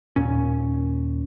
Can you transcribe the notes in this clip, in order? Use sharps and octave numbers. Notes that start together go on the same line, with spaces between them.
D#2 A#2 C#4